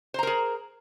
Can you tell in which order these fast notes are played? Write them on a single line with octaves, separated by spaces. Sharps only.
C5 A#5 A#4 G#4